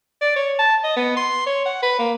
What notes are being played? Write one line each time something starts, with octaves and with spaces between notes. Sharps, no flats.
D5
C#5
A5
D#5
B3
C6
C#5
F#5
B4
A#3